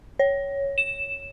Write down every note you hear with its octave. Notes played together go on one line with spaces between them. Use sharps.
C#5
E7